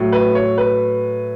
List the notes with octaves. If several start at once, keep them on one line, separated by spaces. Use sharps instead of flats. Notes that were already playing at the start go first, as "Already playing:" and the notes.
Already playing: A2 F#3
B4
C#5
B4